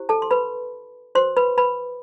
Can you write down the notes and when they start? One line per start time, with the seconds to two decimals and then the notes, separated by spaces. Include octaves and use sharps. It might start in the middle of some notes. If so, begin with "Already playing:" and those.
Already playing: E4 G4 C5
0.09 A4 A5
0.22 C6
0.31 B4 B5
1.15 F#4 B4 C5 C6
1.37 B4 B5
1.58 B4 B5